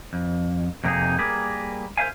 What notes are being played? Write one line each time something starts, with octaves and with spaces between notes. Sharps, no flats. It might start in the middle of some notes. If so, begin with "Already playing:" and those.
F2
F2 C3 A#3 C4 D#4 G#4
G3 A#3 G#4 A#4 B4
A#4 C5 C#5 E5 F5 G#5